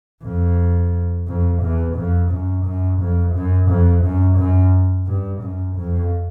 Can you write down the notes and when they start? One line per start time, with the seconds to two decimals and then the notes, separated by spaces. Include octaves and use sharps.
0.24 F2
1.28 F2
1.62 E2
1.96 F2
2.31 F#2
2.65 F#2
3.00 F2
3.34 F#2
3.69 F2
4.03 F#2
4.38 F#2
5.07 G2
5.41 F#2
5.76 F2